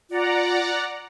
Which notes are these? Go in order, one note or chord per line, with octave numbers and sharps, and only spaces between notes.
F4 D5 F#5 A#5